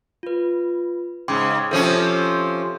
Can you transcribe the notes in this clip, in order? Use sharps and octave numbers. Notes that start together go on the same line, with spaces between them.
F4 B4
G#2 C#3 G5 C6 D6
C3 F3 C#4 A4 D#6